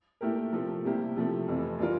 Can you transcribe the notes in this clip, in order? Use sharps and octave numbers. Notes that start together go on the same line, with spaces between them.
A#2 A3 E4 G4 A#4
C3 F3 A3 E4
C3 G3 A#3 E4 G4
C3 F3 A3
F2 E3 A3
E3 G3 D4 F4 A#4